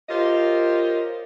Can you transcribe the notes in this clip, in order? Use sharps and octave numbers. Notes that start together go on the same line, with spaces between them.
F4 G4 A#4 C5 C#5 D#5